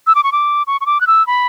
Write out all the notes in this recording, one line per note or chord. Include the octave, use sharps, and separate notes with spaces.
E6
D6
C#6
D6
C#6
C#6
D6
F#6
E6
B5